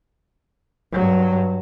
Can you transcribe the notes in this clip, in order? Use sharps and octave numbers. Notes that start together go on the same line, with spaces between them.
G2 F#3